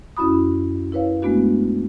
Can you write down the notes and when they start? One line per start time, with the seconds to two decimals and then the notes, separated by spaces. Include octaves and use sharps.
0.17 F#2 C#4 E4 F#4 B5 D#6
0.92 E4 A#4 B4 C#5 F5
1.22 G#3 A3 B3 D4 F#4